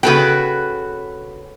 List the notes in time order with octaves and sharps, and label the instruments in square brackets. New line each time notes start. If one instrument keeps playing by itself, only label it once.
[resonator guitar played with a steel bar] C#3 G5 [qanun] F#4 A4 B4